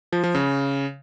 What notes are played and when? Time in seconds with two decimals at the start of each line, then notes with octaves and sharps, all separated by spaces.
0.12 F3
0.24 F3
0.35 C#3